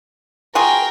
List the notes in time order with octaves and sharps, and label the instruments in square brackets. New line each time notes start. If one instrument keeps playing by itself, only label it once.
[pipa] F4 F#4 G#4 [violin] A#4 G5